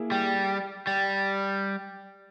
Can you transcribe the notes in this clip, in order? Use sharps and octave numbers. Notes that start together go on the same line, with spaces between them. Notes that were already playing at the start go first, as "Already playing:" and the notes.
Already playing: A#3 E4 G#4 E5
G3
G3